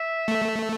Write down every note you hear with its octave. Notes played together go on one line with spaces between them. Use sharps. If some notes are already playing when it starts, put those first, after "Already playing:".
Already playing: E5
A3